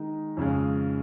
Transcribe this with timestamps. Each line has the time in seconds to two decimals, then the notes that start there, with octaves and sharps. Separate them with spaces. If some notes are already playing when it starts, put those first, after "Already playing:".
Already playing: D#3 G#3 D#4
0.37 F2 C#3 G#3